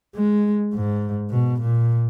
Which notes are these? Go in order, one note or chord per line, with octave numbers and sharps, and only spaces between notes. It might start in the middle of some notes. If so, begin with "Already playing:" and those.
G#3
G#2
B2
A#2